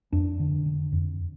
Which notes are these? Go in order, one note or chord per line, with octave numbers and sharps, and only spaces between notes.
F2 D4
D3
D3
F2